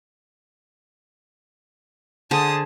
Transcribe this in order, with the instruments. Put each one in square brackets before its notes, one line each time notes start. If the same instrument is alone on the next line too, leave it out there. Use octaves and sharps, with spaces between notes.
[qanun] D3 G#4 C5 [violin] A5 D#6